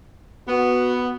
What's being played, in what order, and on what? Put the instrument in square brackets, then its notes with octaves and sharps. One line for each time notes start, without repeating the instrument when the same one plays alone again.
[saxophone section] B3 [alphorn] F#4